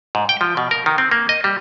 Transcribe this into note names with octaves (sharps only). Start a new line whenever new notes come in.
G#2
G5
F3
B2
A#4
D#3
C4
A#3
D#5
G3